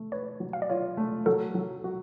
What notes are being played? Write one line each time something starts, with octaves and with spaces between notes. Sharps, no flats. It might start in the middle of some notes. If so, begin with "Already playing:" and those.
Already playing: A3
B4 C#5
F#3
F5
D5
F4 C#5
A3
F#3 A4
F#3
F#4